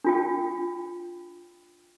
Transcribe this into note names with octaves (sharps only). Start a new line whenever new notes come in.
D4 F4 G5